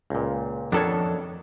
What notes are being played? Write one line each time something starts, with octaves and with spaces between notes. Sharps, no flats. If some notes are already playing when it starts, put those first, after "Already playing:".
C#2 A#2
F2 D#3 B3 D4 A4 C#5